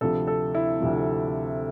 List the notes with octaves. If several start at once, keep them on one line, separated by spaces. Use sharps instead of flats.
D2 C3 F3 A4
A4
E4
D2 C3 F3